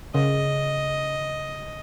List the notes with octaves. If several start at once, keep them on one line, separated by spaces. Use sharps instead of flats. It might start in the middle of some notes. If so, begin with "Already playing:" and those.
C#3 D#5